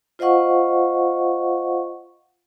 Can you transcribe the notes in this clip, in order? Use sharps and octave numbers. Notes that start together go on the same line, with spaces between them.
F4 C5 D#5 F5 F#5 C#6